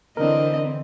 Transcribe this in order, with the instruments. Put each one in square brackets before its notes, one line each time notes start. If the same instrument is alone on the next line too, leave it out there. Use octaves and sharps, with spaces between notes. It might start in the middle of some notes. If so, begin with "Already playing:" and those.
[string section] D3 E3 C4 [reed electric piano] D4 A#4 [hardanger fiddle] D#5